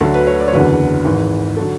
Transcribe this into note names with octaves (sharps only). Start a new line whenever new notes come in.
D2 D3 F#3 A4
B4
C#5
D5
C#5
F#1 E2 D3 F#3 B4
G#1 G#2 E3
D3 F#3 A4